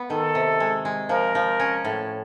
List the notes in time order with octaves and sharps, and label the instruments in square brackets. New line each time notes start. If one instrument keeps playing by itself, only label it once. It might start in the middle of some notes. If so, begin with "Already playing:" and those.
Already playing: [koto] B3
[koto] D#3 [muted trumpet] A4
[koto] C3
G#3
G#3
[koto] F3 [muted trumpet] A#4
[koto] F3
C#4
A2